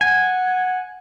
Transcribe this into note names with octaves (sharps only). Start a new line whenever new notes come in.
F#5 G#5